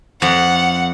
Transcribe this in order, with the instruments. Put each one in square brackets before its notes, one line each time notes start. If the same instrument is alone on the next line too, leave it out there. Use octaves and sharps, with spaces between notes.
[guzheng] F2 [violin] F#5